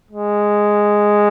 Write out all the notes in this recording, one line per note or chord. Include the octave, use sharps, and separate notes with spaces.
G#3